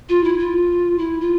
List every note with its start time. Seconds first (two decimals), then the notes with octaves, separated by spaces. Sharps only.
0.09 F4
0.24 E4
0.38 F4
0.98 E4
1.21 F4